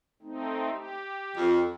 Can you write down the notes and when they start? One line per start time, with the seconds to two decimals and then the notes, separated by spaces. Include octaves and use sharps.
0.22 A3 C4 D#4
0.71 G4
1.37 F2